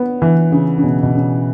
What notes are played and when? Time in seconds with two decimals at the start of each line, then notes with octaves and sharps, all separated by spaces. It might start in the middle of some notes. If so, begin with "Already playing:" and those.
Already playing: B3
0.22 E3
0.52 C#3
0.78 C#3
0.84 B2
1.03 B2
1.15 C#3